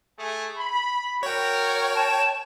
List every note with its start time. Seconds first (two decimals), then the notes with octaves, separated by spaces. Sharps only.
0.18 A3 G#4
0.56 B5
1.23 F#4 A#4 C#5 G5
1.95 A5